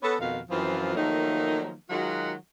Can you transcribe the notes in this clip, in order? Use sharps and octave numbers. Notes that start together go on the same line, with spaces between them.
B3 C#4 A4
F2 B2 D#3 F4 F5
F#2 E3 F3 C4 F4
D#3 F3 F#3 A3 A#3 D#4
D#3 F#3 G#3 F4 F#4